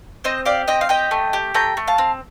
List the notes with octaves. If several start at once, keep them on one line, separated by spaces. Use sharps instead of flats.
C4 C5 D#5
G4 D5 F5
C4 D#5 G5
F5
G4 D#5 G5
A3
G4
A3 G5 A#5
A3
F5 A5
C4